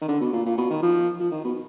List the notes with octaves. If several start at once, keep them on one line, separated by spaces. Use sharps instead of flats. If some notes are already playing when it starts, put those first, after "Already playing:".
D#3
D3
B2
A#2
A#2
B2
D#3
F3
F3
D#3
B2